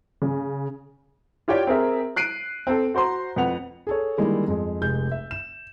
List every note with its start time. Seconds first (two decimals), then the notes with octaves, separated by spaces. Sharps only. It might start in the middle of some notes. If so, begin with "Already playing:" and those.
0.22 C#3
1.48 F4 G4 C#5 D5 G5
1.67 C4 G#4 A#4 E5
2.16 F#6 C7 D7 D#7
2.67 C4 A4
2.94 F#4 C5 A#5 C6
3.36 F2 B4 F#5 F7
3.87 G#4 A4 C#5
4.17 D3 D#3 G3 G#3 A#3 E4
4.48 F2 G#3
4.82 F1 G#3 G6
5.12 E5
5.31 E7